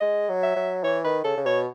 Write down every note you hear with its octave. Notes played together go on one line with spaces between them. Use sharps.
G#3 D#5
F#3
E5
F#3
E3 C#5
D#3 B4
C#3 A4
C#3
B2 C#5